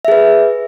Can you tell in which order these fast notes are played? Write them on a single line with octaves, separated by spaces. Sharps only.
E5 G#4 B4